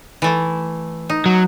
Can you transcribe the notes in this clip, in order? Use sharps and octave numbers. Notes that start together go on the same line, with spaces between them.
E3 A3 E4
D#4
F#3